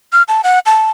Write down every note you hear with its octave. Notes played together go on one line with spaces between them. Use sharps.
F6
A5
F#5
A5